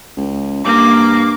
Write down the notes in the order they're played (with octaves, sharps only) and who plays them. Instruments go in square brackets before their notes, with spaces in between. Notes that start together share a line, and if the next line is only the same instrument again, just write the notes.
[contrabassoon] C#2
[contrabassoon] G2 [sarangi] A#3 [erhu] D6